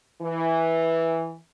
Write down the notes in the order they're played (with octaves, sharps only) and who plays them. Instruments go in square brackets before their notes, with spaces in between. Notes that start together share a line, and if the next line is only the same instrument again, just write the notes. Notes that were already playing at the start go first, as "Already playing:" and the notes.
[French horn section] E3